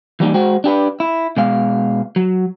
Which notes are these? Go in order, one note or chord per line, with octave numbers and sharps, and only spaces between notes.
E3 G3 A#3 D#4
G#3 F#4 C5 G5
D4 G4 B4
E4
B2 G#3 F5
F#3